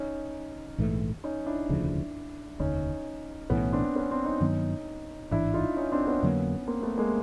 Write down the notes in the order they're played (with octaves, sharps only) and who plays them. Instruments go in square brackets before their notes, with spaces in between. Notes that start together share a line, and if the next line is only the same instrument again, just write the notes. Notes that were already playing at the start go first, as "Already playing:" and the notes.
Already playing: [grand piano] C#4 D#4
[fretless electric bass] A#1 G#2 E3 A3
[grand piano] C#4 D#4
D4 E4
[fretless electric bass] E1 D2 C#3 F3
[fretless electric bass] F1 D#2 D3 [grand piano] C#4 D#4
[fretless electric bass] B1 A2 E3 [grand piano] B3 C#4
[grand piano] C4 D4
B3 C#4
C4 D4
C#4 D#4
[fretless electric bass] G2 D#3 F#3 B3
[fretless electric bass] A1 G#2 E3 [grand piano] D4 E4
[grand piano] D#4 F4
C#4 D#4
C4 D4
B3 C#4
[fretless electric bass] F2 D3 F#3 A#3
[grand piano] A#3 C4
A3 B3
G#3 A#3